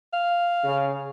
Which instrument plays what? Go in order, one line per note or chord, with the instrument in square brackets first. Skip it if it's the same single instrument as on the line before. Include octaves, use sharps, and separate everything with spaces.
[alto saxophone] F5
[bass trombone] C#3